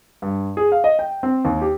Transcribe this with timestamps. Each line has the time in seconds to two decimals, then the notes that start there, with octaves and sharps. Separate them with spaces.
0.22 G2
0.57 G#4
0.72 F5
0.84 D#5
0.99 G5
1.23 C4
1.45 D#2
1.62 G4